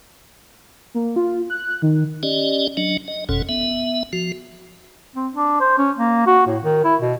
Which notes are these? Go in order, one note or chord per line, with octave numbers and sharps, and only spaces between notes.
A#3
F4
F#6
D#3
C#4 G4 D5 D#5
F#3 D4 D#5
D#5
F#1 F2 B2 C#4 A4
B3 E5
F3 F#4
C4
D4
C5
C#4
A#3
F#4
A2
D#3
E4
B2